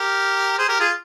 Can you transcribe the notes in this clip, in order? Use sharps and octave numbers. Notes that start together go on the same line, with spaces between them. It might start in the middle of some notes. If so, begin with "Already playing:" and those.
Already playing: G4 A#4
G#4 C5
G4 A#4
F4 G#4